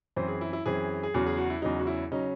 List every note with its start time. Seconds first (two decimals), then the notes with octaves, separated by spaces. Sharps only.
0.16 F#2 E3 C4 C5
0.28 G#4
0.41 E4
0.53 E4
0.66 F#2 E3 C4 G#4
1.03 G#4
1.14 E2 C#3 F#3 F#4
1.26 G#4
1.38 F#4
1.50 E4
1.62 E2 C#3 F#3 D#4
1.79 F#4
1.87 E4
2.11 C#3 F#3 C#4 D#4